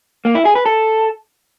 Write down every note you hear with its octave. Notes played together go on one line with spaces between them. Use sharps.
A#3
E4
G#4
B4
A4